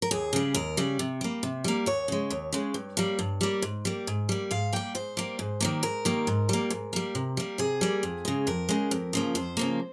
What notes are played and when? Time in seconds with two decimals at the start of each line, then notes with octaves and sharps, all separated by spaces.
0.02 A#4
0.11 D#2 G#4
0.33 C#3 G3
0.54 D#2 A#4
0.77 C#3 G3
0.99 C3
1.21 G3 A#3
1.43 C3
1.64 G3 A#3
1.86 D#2 C#5
2.08 C#3 G#3
2.30 D#2
2.53 C#3 G#3
2.74 G2
2.97 G3 A#3
3.19 G2
3.41 G3 A#3
3.62 G#2
3.85 G3 A#3
4.07 G#2
4.29 G3 A#3
4.51 G#2 F5
4.73 G3 A#3 G5
4.95 G#2 C5
5.17 G3 A#3
5.39 G#2
5.61 D#3 G3 A#3
5.83 G#2 A#4
6.05 D#3 G3 A#3
6.27 G#2
6.49 G3 A#3
6.70 G#2
6.93 G3 A#3
7.15 C3
7.37 G3 A#3
7.58 C3 G#4
7.81 G3 A#3
8.03 F2
8.25 C#3 G#3
8.47 F2 A#4
8.69 C#3 G#3
8.91 F2
9.13 C#3 F3 A#3
9.35 F2 C5
9.57 C#3 F3 A#3